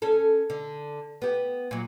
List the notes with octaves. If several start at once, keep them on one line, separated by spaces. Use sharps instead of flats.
C#4 A4
D3
B3 G4
A#2 F#3